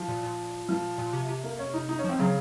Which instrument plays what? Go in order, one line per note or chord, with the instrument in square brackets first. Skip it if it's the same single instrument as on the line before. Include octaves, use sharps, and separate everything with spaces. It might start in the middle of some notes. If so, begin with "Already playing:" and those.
Already playing: [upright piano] F3
[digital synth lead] A#2
A#2
[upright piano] F3
[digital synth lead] A#2
C3
C3
[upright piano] A#3
C#4
D#4
D#4
C#4
[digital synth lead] F3 [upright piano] C4
[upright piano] C#3 [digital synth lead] F#3